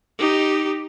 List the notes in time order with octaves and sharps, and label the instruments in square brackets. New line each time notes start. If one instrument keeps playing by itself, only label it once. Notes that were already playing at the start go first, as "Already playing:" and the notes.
[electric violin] D#4 G4